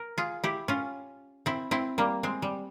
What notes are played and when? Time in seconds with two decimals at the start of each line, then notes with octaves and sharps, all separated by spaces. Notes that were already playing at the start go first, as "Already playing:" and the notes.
Already playing: A#4
0.18 F4 G#4
0.44 E4 G4
0.68 C#4 F4
1.46 C4 E4
1.71 C4 E4
1.98 G3 A#3
2.23 G#3 C4
2.42 G3